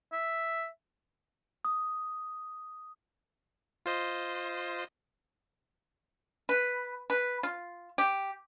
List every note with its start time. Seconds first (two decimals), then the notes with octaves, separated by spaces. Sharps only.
0.13 E5
1.65 D#6
3.86 F4 C5 D#5
6.49 B4
7.10 B4
7.43 F4
7.98 G4